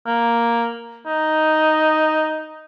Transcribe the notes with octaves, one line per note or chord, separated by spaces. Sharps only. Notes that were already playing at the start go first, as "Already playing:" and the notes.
A#3
D#4